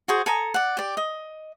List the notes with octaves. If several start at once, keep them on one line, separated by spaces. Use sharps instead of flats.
F#4 G#4 C5
A4 G#5 A#5 D#6
D5 F#5
G4 D5
D#5